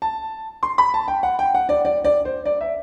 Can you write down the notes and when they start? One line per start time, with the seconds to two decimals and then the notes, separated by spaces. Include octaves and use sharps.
0.02 A5
0.63 C6
0.78 B5
0.94 A5
1.08 G5
1.23 F#5
1.39 G5
1.55 F#5
1.69 D5
1.85 D5
2.04 D5
2.25 C5
2.45 D5
2.61 E5